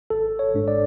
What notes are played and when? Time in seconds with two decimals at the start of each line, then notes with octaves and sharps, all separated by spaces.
0.10 G#1 A4
0.39 C#5
0.54 G#2 G#3 D4
0.68 D5